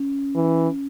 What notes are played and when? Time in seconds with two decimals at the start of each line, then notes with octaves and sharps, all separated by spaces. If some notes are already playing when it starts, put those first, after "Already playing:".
Already playing: C#4
0.35 E3